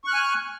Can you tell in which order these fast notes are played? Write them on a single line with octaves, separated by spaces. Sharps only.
C#6 F#6 F6 G#5